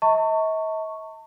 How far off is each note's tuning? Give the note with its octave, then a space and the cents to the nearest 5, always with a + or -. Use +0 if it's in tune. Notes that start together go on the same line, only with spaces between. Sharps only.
D#5 +45 A5 +40 C#6 +0